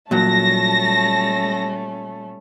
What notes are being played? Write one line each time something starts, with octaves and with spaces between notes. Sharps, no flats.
A#2 F#3 G3 A3 C#4 A5 A#6